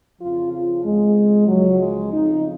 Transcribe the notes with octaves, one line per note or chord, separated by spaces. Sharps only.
F2 C#3 F3 F4
F4
F2 C#3 F3 G#3
C#2 C#3 F3 F#3
G#3
F2 C#3 F3 D#4